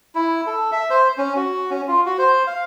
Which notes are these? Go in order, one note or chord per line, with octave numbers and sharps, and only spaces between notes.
E4
A4
E5
C5
C#4
F#4
C#4
F4
F#4
C5
F5